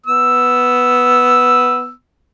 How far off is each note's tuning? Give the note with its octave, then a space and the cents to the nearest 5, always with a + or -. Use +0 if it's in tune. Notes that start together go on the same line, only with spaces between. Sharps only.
B3 +0 E6 +0